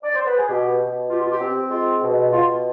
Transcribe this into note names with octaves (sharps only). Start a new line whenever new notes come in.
D5
C5
B4
G#4
B2 G4
B2
F4 G4
F4
G4
C4
G#3 F4
B2
B2 F4